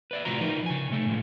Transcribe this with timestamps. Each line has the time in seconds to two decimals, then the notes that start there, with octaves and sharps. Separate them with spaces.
0.11 B4 D5 E5
0.25 A2 C3 F3 F#4 A#5
0.41 F3 D#4 A#4 B4
0.66 C#3 G#5
0.90 C3 A3 A4
1.06 A2 F3 G#3